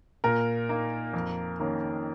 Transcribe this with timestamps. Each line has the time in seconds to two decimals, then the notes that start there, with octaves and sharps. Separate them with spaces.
0.24 A#2 A#4
0.69 A#3 D#4
1.13 F2
1.60 D#3 A#3 C#4